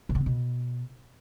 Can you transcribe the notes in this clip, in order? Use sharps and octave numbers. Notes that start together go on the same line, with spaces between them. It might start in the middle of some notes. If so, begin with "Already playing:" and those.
C3
D3
C4
B2